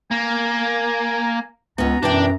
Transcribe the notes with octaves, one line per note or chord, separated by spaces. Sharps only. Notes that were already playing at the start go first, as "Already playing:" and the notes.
A#3 G#5
C#2 B3 C#4 A#5
F#2 B2 E3 D4 G5